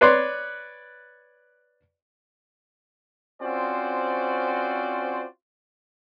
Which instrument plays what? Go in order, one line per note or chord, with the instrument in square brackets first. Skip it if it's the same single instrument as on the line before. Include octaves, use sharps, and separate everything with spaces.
[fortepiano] B4 C#5 D5 C6
[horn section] C4 C#4 F4 F#4 C5 D5